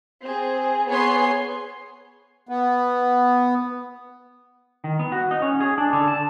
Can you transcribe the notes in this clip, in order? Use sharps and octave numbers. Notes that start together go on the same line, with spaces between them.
C4 G#4
B3 G#4 C#5 C6
B3
D#3
B3
F#4
D#4
C#4
G#4
D4
D3
A5